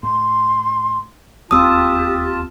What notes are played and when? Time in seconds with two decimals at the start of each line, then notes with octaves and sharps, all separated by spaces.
0.03 A2 C6
1.51 E1 D#2 C4 F4 G4 A5 D#6 E6